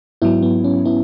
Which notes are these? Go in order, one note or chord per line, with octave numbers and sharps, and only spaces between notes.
G#2 F#3 B3 E4
B3
C#4
B3 E4